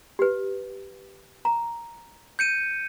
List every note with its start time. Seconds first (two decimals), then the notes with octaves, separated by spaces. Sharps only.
0.19 G4 B4
1.45 A#5
2.39 G6 C#7 D#7